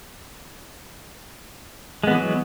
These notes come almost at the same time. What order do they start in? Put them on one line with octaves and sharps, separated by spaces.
G#3 B3 E3 F#3